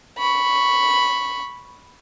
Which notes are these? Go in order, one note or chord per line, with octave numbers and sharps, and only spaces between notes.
B5 C#6